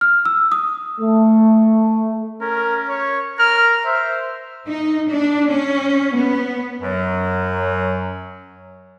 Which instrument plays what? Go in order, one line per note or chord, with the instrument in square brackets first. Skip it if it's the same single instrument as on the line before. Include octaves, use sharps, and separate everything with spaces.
[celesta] F6
E6
D#6
[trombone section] A3
[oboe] C#4 [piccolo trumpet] A#4
[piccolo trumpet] C#5
[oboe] A#4 [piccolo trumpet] F6
[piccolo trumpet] C5 [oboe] E5
[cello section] D#4
D4
C#4
B3
[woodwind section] F#2 F#3